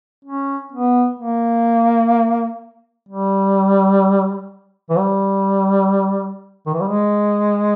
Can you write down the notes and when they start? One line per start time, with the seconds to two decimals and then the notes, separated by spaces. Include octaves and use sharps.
0.25 C#4
0.72 B3
1.20 A#3
3.09 G3
4.90 E3
4.98 G3
6.66 D#3
6.73 E3
6.81 G3
6.88 G#3